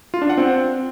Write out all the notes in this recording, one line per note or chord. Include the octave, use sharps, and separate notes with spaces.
F4
D4
F#5
C4